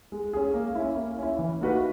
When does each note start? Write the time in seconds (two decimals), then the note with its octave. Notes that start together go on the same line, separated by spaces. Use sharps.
0.12 G#3
0.33 C#4 G#4
0.54 A#3
0.75 C#4 E4
0.96 A#3
1.19 C#4 E4
1.39 E3
1.61 A#3 D#4 F#4 B4